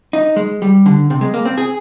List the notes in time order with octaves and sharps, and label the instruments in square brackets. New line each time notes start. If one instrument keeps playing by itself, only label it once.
[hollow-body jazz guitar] D#4
G#3
G3
D3
C3
G#3
A#3
C4
G#4